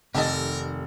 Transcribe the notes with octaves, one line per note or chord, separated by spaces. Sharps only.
F1 C3 D#3 G4 A4 A#4 D#5 A6